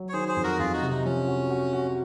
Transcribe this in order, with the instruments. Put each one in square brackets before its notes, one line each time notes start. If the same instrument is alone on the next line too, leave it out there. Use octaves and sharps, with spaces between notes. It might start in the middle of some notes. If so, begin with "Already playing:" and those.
Already playing: [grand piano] F#3
[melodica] C#5
[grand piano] D#3 [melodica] G#4 C5
[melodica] G#4 C5
[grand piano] F2
[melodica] F#4 A#4
[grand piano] F2 [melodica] F4 G#4
[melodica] D#4 F#4
[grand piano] C3
[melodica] D#4
[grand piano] F3 [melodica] C#4
[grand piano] F#4
F#4
F#4